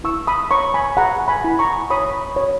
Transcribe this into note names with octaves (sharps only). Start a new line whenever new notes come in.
E4 C#6 E6
B5 D#6
C#5 A#5 C#6
G#5 B5
G#4 F#5 A#5
G#5 B5
E4
A#5 C#6
C#5 B5 D#6
C#5